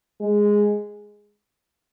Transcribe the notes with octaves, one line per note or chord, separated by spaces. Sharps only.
G#3